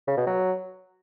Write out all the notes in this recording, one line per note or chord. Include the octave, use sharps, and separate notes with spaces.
C#3
B2
F#3